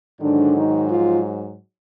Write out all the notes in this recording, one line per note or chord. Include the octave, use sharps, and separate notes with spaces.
G#2 D3 D#3 F#3 D4
D#3 D#4
F3 F4